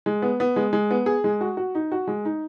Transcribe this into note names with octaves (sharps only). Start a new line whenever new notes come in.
G#3
B3
B3
G#3
G#3
B3
G#4
G#3
F#4
F#4
D#4
F#4
G#3
D#4